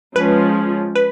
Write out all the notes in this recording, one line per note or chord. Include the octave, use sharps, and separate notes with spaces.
F3 G#3 C#4 F4 B4
B4